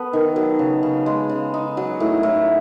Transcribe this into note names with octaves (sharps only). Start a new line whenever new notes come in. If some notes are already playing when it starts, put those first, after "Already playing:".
Already playing: B3 A4
D#3
F#3
C#3
C#3
G#3
C#3
D#4
F#3
A2
A2